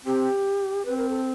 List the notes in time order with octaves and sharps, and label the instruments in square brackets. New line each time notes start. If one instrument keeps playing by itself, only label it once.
[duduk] C4 [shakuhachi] G4
[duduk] C4 [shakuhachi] B4
[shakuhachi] A#4
A4